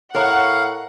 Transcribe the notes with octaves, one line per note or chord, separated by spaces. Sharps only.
A2 A#4 C#5 F5 F#5